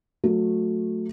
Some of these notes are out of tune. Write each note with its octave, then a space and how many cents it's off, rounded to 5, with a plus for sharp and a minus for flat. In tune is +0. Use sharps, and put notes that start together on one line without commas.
F#3 -20 A3 +0